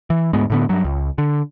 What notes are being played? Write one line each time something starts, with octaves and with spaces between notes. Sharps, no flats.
E3
D2 G#2 G#3 B3
A2 D3 B3
G2 F#3
C#2
D3